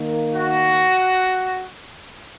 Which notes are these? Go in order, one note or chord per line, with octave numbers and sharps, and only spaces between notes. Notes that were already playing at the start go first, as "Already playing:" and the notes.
Already playing: D#3 A#3
F#4